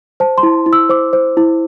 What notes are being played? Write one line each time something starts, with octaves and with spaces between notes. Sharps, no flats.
C5 A5
C6
E4
E4
E6
C5 D6
C5
E4